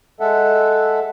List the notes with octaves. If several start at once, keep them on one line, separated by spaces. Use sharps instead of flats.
G#3 A4 E5 F#5